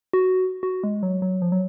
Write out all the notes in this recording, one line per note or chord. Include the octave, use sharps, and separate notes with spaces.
F#4
F#4
G#3
F#3
F#3
F3
F#3